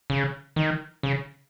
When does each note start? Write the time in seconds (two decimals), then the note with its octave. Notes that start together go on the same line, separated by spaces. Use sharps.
0.10 C#3
0.56 D#3
1.03 C#3